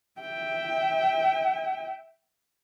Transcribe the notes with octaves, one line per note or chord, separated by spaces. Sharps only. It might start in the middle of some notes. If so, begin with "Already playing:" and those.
E5 G5